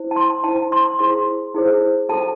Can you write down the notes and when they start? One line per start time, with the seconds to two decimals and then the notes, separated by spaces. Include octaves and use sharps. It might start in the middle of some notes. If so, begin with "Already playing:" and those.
Already playing: E4 C5
0.11 A5
0.16 C6
0.44 E4 C5 A5
0.72 C6
0.99 E4 G#4 C5 C6
1.54 E4 G#4 C5
2.09 F#4 A4 C5 A5